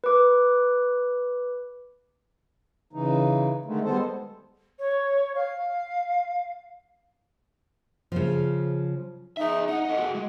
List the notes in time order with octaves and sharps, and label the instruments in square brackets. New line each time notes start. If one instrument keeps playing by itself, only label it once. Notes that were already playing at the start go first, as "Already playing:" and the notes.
[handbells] B4 D6
[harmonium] C#3 E3 D#4
D3 D#3 G#3 A3
G3 G#3 B3 A4 C5
[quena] C#5
F5
[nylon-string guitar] C#3 F3
[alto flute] D#4 [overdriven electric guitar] G#4 E5
[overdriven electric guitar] D#4 [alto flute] F#5
[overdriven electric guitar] A4 D#5
F#4 G#4
G#3